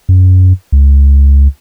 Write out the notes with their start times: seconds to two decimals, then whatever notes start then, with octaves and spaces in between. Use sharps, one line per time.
0.09 F#2
0.72 C#2